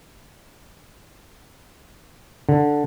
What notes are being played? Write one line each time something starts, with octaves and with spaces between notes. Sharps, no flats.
D3